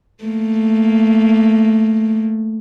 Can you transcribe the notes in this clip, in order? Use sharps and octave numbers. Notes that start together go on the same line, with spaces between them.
A3 A#3